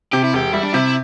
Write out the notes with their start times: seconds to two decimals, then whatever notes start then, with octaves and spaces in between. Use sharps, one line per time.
0.13 C3 G4
0.24 E4
0.33 E1 G4
0.53 G3 E4
0.63 D4
0.74 C3 E4